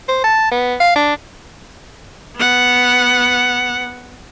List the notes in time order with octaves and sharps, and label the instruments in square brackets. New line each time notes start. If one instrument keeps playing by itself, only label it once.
[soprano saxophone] C5
A5
B3
F5
D4
[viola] B3 F#5